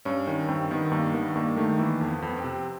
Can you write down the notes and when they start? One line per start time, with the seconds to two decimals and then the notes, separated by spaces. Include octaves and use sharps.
0.05 G2 C#4
0.27 D#3 C#4
0.48 G2 C4
0.71 D#3 B3
0.92 G2 A#3
1.14 D#3 B3
1.35 G2 A#3
1.57 D#3 A3
1.79 E3 A#3
2.01 F2
2.08 B3
2.22 F2
2.29 B3
2.38 C4
2.44 C3